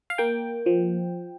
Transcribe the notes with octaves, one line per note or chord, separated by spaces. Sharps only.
F5
A#3 G5
F3